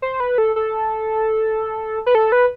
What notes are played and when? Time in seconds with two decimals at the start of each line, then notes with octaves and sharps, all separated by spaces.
0.02 C5
0.20 B4
0.38 A4
0.56 A4
2.06 B4
2.15 A4
2.32 B4